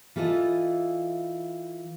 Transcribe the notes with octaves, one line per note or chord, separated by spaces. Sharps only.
E3 F4 A4 D#5